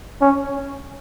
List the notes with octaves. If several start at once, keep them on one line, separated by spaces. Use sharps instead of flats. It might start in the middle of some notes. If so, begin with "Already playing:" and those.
C#4